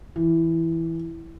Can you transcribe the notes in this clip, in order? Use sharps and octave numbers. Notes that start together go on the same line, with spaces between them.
E3